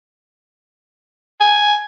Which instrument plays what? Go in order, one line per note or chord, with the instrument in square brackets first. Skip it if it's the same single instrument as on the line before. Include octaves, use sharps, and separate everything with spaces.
[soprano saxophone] G#5